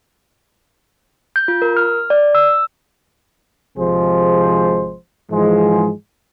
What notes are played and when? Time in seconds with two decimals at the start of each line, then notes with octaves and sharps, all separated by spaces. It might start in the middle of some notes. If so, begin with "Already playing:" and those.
1.36 G6
1.48 F4
1.62 A#4
1.77 F6
2.10 D5
2.35 E6
3.77 G#1 C3 F3 G#3 G#4 C5
5.31 G#2 E3 F3 G#3